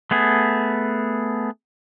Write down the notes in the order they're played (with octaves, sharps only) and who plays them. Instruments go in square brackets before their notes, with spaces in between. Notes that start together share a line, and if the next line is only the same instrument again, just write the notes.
[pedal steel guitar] A3 B3 G#4